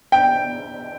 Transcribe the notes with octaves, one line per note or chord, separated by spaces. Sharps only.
G5